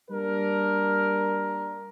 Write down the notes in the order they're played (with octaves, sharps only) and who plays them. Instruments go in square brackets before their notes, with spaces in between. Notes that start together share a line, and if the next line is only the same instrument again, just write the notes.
[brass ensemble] G3 A#3 D4 A#4